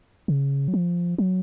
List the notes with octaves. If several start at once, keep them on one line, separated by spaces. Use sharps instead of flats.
C#3
F#3
F3
F#3